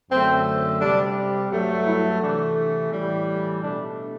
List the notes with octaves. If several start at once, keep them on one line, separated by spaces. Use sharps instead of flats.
F#2 D3 A3 C4
C3 G3 D4
G2 F#3 A3
E4
C3 E3 A3 D4
A2 E3 G3
B2 A3 D4